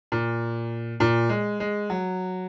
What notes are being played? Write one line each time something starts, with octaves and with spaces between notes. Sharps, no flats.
A#2
A#2
G#3
G#3
F#3